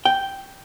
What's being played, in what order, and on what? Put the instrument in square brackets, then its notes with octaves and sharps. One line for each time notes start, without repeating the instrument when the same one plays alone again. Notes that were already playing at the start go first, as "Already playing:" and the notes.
[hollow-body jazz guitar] G5